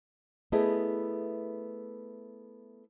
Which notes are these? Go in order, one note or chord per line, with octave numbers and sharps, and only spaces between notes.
A3 B3 E4 G#4 D#5